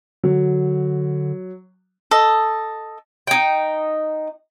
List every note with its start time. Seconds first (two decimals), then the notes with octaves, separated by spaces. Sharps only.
0.24 D3 F#3
2.11 A4 D#5
3.27 D#4 G5